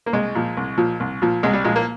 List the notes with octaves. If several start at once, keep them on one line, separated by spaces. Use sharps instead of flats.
A#3
C2 G#3
A#2 F3
C2
A#2 F3
C2
A#2 F3
C2 G#3
G3
A#2 F3 G#3
A#3